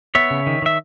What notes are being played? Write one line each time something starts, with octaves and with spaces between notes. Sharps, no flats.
B3 C#5 E5
C#3
D#3
D#3 E5